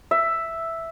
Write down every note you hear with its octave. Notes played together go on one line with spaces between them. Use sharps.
E5